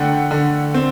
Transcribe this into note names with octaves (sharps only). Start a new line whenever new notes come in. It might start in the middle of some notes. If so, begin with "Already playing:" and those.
Already playing: D3 A3 F#5 G5
D3
C4